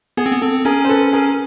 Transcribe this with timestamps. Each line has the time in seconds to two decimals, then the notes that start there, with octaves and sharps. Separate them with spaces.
0.17 B3 G#4
0.26 C4
0.33 B3
0.41 C4 A4
0.65 C#4 G#4 A#4
0.85 C5
0.89 A4 B4
1.13 G#4 A#4